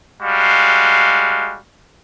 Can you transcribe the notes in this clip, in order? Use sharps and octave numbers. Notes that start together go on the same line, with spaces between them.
G3 G#3 F#4 F5